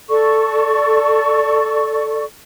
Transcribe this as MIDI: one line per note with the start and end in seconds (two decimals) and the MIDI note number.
0.10 2.23 69
0.10 2.23 74
0.10 2.23 85